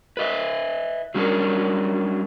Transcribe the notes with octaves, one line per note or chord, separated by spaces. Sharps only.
B4 D#5 E5
F#3 G3 C#4 D4 A#4